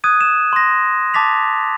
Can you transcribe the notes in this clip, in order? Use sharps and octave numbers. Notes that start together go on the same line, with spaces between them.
D#6 F#6 G#6 D#7
E7
C6 A#6
A5 D6 A6 B6 F7